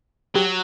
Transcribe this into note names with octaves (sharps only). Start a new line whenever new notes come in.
F#3 G4